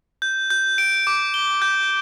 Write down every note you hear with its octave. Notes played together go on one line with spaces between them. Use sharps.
G6
G6
D7
D6
G7
G6